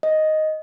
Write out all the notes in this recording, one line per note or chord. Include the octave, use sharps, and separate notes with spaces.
D#5